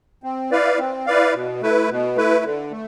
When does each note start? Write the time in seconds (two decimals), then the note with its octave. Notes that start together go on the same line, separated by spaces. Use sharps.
0.23 C4
0.51 E4 B4 D5 F5
0.79 C4
1.06 E4 B4 D5 F5
1.34 B2
1.61 A3 E4 B4
1.89 B2
2.16 A3 E4 B4
2.45 D3
2.71 A3